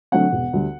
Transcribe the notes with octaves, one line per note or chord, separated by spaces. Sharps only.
D3 F#3 A3 C4 F#5
E1
D2 D3 G3